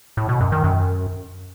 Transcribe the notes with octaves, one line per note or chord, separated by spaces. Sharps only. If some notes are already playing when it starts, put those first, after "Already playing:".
A2
B2
F#2
D#3
F#2